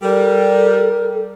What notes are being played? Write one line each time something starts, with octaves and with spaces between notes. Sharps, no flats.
G3 A4 A#4